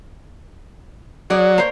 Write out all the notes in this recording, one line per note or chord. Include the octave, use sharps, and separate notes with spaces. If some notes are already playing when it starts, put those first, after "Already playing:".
F#3 G#4 D5
A#3 C5 C#5